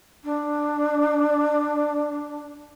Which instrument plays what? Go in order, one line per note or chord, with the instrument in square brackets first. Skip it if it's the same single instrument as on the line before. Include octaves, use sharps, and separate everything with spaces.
[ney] D4